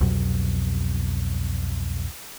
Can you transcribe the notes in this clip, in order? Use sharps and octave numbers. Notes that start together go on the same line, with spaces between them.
C2 F2 B2 F#3